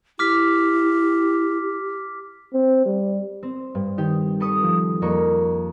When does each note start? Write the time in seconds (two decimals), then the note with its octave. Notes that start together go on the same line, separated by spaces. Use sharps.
0.19 E4 G4 D6 F6 B6
2.53 C4
2.86 G3
3.43 C4
3.75 G2
3.98 D#3 G4
4.40 A4 B4 A5 C#6 D#6
4.63 F3
5.02 F2 A#3 C#6